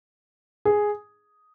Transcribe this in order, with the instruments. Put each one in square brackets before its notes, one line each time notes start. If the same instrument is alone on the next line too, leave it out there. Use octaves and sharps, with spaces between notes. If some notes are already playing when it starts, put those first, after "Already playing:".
[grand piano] G#4